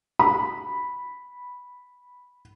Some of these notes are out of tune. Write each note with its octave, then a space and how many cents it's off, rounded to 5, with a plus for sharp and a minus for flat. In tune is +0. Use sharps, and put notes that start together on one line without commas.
B5 -5